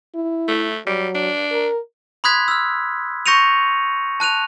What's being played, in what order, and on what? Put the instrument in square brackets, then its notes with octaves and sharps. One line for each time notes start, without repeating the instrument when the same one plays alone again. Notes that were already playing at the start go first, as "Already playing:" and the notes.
[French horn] E4
[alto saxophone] A3
[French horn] F#3 [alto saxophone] G3
[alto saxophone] D4
[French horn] A#4
[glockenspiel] B5 C6 D#6 F#6 G#6 B6
E6 F6
C#6 G6 A#6 C#7 D#7 F7
A5 F#6 D#7 F7